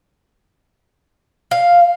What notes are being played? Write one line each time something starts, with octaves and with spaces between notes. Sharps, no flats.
F5